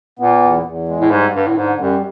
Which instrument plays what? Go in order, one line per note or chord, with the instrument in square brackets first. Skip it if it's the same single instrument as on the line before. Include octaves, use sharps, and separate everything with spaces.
[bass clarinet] A#2 [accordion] B3
[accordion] E2
E2
G#3
[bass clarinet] A2
[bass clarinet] G#2 [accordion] G3
[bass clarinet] G2 [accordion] D3
[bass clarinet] A2
[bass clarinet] G#2 [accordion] D3
[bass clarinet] F#2 [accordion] G3